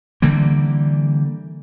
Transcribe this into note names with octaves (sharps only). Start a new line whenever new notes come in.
D3 E3 G3 A#3